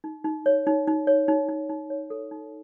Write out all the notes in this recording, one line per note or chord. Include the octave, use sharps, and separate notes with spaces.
D#4
D#4
C#5
D#4
D#4
C#5
D#4
D#4
D#4
C#5
A4
D#4